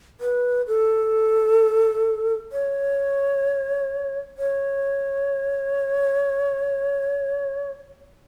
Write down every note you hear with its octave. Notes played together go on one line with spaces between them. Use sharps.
B4
A4
C#5
C#5